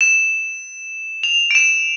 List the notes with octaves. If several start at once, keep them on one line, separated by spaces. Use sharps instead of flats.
E7
F7
D7
E7